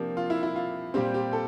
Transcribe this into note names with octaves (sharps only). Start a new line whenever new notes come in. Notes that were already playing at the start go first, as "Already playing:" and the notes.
Already playing: C3 F3 A#3 D4 G4
F4
E4
E4
F4
A#2 G3 C4 G4
G4
A4